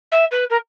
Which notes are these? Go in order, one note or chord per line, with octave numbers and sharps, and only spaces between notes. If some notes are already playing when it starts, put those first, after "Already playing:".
E5
B4
A#4